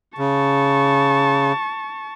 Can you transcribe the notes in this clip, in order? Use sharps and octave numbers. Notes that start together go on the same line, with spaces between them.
C#3 A5 C#6